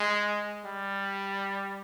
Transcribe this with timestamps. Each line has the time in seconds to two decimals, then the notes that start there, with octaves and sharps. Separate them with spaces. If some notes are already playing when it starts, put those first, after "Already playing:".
Already playing: G#3
0.65 G3